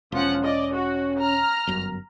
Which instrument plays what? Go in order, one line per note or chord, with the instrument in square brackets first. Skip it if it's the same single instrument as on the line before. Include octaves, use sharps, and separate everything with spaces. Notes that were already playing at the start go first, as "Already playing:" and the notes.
[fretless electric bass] E1 [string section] F3 F#5 [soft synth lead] C#4
[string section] D5 D#5
F#4
A#5 F6
[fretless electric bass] G1 F#2